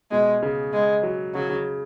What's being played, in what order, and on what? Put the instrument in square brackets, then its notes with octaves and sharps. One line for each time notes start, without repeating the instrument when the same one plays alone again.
[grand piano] B2 [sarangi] G#3
[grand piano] C#3
[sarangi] G#3
[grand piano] F#3
[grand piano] C#3 [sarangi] F#3
[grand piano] C#3